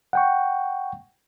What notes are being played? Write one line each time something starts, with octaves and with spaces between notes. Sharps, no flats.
F#5 G5 C#6